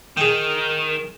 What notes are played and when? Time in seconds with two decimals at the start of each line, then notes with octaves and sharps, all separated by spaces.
0.17 D#3 G#4 G5